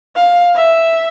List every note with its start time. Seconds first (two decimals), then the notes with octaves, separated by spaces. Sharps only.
0.16 F5
0.56 E5